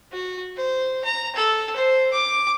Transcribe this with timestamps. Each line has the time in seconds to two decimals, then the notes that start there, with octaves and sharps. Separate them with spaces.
0.12 F#4
0.57 C5
1.05 A#5
1.36 A4
1.76 C5
2.13 D6